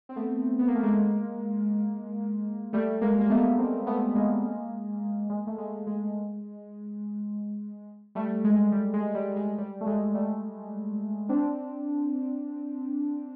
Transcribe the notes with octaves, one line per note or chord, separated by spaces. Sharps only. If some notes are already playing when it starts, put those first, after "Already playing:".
C4
A3 B3
B3
A#3
A3
G#3 A#3
G3 A3
G#3 A#3
A#3
A3 B3
A#3 C4
A3 B3
G#3 A#3
G#3
A3
G#3
G#3
G3 A3
G#3
G3
G#3
G3
G#3
G3
A3
G#3
G3 A3
C4 D4